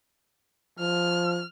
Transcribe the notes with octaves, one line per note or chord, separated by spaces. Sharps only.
F3 F6